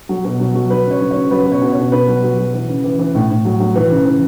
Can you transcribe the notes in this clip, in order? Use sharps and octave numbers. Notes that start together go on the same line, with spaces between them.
F#3
B2
F#3
F#3
F#3 B4
C#3 C#5
F#3
C#5
C#3
F#3 B4
B2
C#5
B2
C#5
B2
B2 B4
F#3
F#3
F#3
E3
C#3
E3
E3
A2
A2
F#3
F#3
E3
C#3
E3